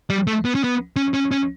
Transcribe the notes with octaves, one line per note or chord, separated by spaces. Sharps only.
G3
A3
B3
C#4
B3
C#4
C#4
C#4